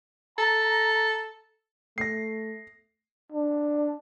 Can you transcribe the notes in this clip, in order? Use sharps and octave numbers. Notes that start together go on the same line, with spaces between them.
A4 A#5
A3 A#6 C7
D4